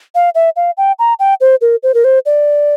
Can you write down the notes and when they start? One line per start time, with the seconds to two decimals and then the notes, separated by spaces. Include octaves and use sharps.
0.15 F5
0.35 E5
0.56 F5
0.77 G5
0.99 A#5
1.20 G5
1.41 C5
1.61 A#4
1.83 C5
1.94 A#4
2.04 C5
2.26 D5